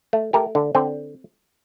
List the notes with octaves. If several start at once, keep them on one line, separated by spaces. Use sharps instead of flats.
A3
A3 G4 A#4
D3
D3 C4